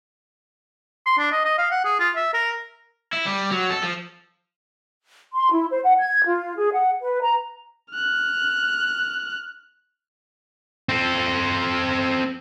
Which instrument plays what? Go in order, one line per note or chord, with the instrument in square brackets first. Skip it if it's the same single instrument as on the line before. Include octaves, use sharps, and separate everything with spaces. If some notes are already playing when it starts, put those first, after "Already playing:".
[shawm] C6
D4
D#5
D#5
F5
F#5
G#4
F4
E5
A#4
[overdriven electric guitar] E4
G3
F#3
A4
F3
[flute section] C6
E4
C5
F#5
G#6
F4
G#4
F#5
B4
A#5
[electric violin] F6 F#6
[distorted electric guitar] C4 A4